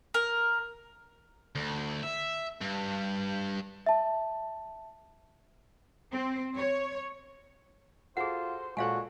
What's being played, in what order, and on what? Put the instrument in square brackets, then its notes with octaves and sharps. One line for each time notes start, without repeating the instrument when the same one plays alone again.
[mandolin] A#4
[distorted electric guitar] D2
E5
G2
[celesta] E5 A5
[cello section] C4
C#5
[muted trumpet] F4 [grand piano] F#4 A4 [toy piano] G#4 F#5 [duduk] C5
[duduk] A#2 [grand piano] G#3 A4 [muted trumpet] F#4 [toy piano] C#5 F5 G#5